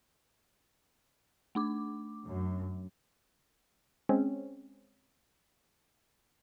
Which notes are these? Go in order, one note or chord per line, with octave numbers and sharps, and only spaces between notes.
A3 D4 D6
F#2
G#3 C4 C#4